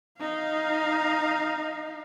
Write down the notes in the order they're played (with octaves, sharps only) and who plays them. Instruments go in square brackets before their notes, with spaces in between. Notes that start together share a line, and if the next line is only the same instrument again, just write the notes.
[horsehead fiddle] D#4 F5